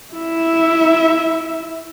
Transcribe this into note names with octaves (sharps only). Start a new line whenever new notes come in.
E4 E5